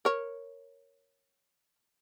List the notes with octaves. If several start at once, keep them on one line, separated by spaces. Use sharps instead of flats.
A#4 C#5